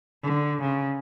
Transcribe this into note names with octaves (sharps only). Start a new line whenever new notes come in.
D3
C#3